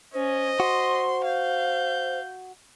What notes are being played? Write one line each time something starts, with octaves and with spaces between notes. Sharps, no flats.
C#4 C5 D#5
F#4 C6
F5 G6